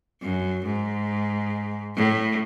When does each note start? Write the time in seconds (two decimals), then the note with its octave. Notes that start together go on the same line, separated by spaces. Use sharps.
0.22 F#2
0.66 G#2
1.96 A2